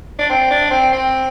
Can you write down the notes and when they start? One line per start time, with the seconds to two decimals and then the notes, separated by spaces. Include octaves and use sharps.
0.19 D4
0.30 C4
0.51 D4
0.71 C4
0.93 C4